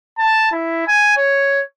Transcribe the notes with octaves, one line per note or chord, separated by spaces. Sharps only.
A5
E4
G#5
C#5